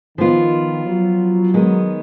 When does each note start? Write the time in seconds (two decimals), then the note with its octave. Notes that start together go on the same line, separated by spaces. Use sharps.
0.18 D#3 F3 B3 F4
0.85 F#3
1.54 D#3 G#3 B3